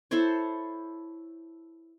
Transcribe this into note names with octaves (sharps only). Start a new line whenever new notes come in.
E4 A4 C5 C#5